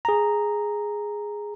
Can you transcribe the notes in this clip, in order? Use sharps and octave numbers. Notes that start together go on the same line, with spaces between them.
G#4 A#5